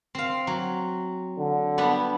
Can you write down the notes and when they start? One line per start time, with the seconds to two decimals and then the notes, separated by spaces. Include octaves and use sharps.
0.15 C4 F5
0.47 F#3
1.39 D3
1.78 G3 B3 D4